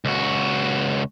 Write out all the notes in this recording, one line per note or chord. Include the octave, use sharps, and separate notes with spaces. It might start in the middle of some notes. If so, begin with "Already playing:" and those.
C#2 F#4